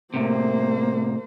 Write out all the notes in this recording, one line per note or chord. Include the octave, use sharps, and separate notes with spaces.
A2 C3 A#3 C5